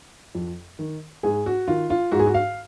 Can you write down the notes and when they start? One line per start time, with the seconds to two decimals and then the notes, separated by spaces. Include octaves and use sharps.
0.35 F2
0.79 D#3
1.23 G#2 G#4
1.46 F#4
1.68 D#3 F4
1.90 F4
2.12 G#2 F#4
2.19 G#4
2.26 F#4
2.34 F5